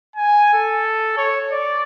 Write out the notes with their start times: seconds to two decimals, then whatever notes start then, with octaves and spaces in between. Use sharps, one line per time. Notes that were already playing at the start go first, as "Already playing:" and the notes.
0.16 G#5
0.53 A4
1.17 C#5
1.52 D5